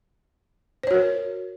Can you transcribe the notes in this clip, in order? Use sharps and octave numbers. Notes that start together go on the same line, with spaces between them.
F#4 A#4 C5 C#5